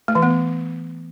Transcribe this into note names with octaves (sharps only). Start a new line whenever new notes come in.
A3
E3
B3